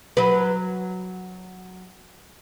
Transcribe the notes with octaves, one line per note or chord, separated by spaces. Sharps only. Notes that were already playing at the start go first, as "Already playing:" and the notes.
F#3 B4